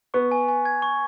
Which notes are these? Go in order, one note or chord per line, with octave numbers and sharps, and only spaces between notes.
B3 C#6
G#5
G#5
G#6
C#6